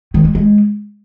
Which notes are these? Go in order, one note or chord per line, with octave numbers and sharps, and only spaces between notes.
D#3
G#3
G#3